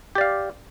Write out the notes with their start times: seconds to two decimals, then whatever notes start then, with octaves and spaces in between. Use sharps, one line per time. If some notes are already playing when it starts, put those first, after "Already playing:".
0.15 G4
0.18 D5
0.21 F5